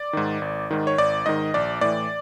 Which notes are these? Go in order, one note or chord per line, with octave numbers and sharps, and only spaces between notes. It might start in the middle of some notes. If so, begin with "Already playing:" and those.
Already playing: D5
G#2 D#3
G#1
G#2 D#3
C#5
G#1 D5
G#2 D#3 D#5
A#1 D5
A2 E3 D5